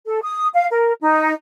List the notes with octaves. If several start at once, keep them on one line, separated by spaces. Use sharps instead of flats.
A4
D#6
F5
A#4
D#4